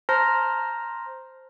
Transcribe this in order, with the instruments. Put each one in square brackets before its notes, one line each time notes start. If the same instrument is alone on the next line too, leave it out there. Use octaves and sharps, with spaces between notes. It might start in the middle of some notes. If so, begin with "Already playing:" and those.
[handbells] C5 A5 A#5 C6 F6 A#6